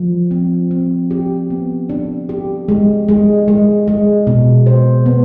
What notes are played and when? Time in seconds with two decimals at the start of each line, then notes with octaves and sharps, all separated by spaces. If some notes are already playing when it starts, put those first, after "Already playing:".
Already playing: F3
0.31 C4
0.71 C4
1.11 G4
1.50 B3
1.89 D4
2.29 G4
2.69 G#3
3.08 G#3
3.48 G#3
3.88 G#3
4.27 B2
4.66 C5
5.06 B3